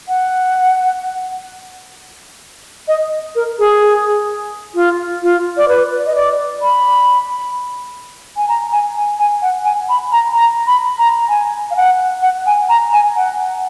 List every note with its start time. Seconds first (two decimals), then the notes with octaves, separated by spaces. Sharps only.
0.08 F#5
2.88 D#5
3.35 A#4
3.59 G#4
4.75 F4
5.23 F4
5.57 D5
5.69 B4
6.06 D#5
6.15 D5
6.62 B5
8.37 G#5
8.48 A#5
8.72 G#5
8.96 G#5
9.19 G#5
9.42 F#5
9.65 G#5
9.89 B5
10.12 A#5
10.35 A#5
10.67 B5
10.99 A#5
11.29 G#5
11.71 F5
11.76 F#5
12.22 F#5
12.46 G#5
12.69 A#5
12.93 G#5
13.17 F#5